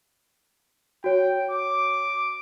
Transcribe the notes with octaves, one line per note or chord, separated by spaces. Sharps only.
F#4 C#5 G5
D6